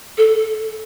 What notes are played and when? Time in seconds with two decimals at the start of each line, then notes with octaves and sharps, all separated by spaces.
0.18 A4